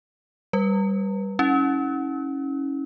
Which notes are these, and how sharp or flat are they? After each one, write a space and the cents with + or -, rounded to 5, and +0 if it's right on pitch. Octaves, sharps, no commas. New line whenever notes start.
G3 +0 B4 -35
C#4 -10 E4 -45